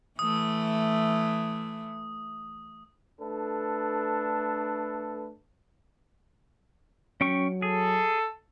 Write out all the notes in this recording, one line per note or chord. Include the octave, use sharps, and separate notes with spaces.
E3 A3 D#6
A3 D4 A4 B4
F#3 C#4 G5 C#6
G#4 A4